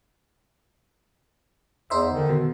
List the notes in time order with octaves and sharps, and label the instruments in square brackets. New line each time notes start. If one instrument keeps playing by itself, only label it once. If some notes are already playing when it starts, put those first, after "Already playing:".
[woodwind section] E2 [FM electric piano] D#4 C5 E5
[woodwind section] D3 D#3
[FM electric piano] B2